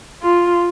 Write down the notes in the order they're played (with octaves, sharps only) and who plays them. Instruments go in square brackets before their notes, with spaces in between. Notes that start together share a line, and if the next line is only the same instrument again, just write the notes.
[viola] F4